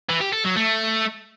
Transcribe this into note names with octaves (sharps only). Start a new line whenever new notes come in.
E3
G4
A4
F#3
A3